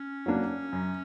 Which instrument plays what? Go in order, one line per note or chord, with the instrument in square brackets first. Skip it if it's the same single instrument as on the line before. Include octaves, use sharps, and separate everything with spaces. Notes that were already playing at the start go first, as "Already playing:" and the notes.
Already playing: [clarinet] C#4
[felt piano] F#3 A#3 D4
F#2